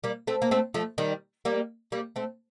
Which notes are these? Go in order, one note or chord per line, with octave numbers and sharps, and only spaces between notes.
G3 A#3
A3 C4
A#3
A3 C4
F3 A3
D#3 G3
G3 A#3
G3 A#3
A3 C4